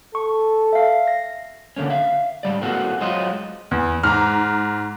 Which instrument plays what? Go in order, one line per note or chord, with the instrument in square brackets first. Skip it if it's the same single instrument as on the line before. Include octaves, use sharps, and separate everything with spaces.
[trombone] A4 [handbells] C#6
[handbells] E5 F5
A#6
[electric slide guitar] D3 A3 A#3 C#4
E5 F5
G#2 F3 G3 D5
A#3 C4 F#4 G#4 A4
F#3 G#3 D#4 F4 C5 D#5
[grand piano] E2
[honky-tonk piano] G#2 A#5 [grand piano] F6